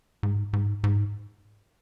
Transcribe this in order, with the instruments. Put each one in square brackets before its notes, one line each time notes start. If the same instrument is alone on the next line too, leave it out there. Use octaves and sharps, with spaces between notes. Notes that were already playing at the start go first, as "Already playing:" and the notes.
[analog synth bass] G#2
G#2
G#2